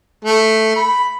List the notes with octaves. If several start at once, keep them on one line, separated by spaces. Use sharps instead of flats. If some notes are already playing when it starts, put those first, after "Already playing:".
A3
B5